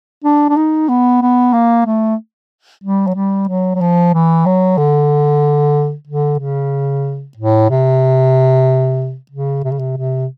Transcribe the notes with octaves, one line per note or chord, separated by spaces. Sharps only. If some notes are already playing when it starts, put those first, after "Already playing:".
D4
D4
D#4
B3
B3
A#3
A3
G3
F#3
G3
F#3
F#3
F3
E3
F#3
D3
D3
C#3
A2
C3
C#3
C3
C#3
C3
C3